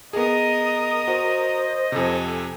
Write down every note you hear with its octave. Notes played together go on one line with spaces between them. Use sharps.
B3 G#4 A#4 D#5 D#6
F#4 C5
F2 C3 A4 G#5